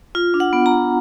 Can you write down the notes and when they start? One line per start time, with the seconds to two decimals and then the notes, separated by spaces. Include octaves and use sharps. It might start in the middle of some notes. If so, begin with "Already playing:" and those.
0.15 F4
0.34 D4
0.40 F#5
0.53 B3
0.66 A#5
0.72 B3